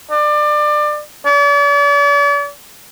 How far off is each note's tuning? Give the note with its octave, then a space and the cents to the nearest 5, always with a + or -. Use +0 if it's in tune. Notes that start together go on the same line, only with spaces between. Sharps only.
D5 +25
D5 -45